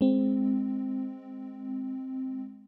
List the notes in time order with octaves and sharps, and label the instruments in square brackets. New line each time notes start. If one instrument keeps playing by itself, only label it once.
[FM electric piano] G#3 C4